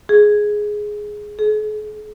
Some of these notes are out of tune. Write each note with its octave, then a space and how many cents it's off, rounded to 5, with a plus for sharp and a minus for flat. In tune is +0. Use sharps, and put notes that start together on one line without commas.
G#4 +5
G#4 +45